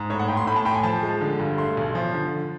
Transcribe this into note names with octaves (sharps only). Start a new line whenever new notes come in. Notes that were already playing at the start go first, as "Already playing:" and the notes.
Already playing: G#2
A2 C#5
F#5
A2 G5
C6
A2 B5
A5
A2 G5
G#5
F3 A5
G#3
D3
G2
A3 C6
B1
F3
D3